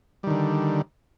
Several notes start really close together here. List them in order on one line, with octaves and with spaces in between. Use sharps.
G3 D#3 D3